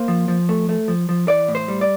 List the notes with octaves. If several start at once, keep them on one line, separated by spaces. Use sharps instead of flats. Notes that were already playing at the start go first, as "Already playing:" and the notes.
Already playing: A#3 C5
F3
F3
A3
A3
F3
F3
E3 D5
A2
C5
G3
D5